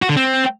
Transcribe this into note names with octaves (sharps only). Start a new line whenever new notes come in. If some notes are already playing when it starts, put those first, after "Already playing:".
F#4
D3
C4